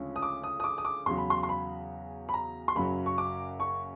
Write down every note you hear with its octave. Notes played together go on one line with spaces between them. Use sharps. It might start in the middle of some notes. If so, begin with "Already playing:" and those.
Already playing: D2 C#3 F3 G#3 C#4
D#6
D6
D#6
D#6
D6
D#6
D6
E2 C#3 F#3 C6
B5
C6
C6
B5
B5
A#5
C6
F#1 F#2 C#3 F#3 B5
C#6
D6
C#6